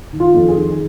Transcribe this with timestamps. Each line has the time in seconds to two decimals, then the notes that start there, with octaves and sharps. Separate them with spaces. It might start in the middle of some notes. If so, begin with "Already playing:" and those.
0.13 D#3
0.20 F4
0.34 F2
0.48 G#4
0.55 D#3